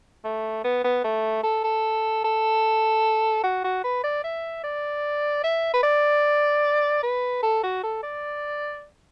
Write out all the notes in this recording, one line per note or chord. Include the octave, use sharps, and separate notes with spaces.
A3
B3
B3
A3
A4
A4
A4
F#4
F#4
B4
D5
E5
D5
E5
B4
D5
B4
A4
F#4
A4
D5